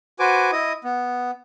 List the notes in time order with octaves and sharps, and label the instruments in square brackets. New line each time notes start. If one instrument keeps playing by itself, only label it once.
[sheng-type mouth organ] F#4 B4 C5 G#5 D6
E4 D#5 D#6
B3